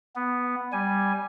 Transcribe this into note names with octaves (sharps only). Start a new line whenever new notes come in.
B3
G3 G#5